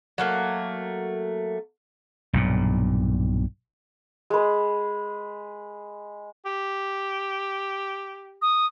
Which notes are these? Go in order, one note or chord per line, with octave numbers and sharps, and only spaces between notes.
F#3 A3 A#3
B1 G2 A#2
G#3 B4
G4
D#6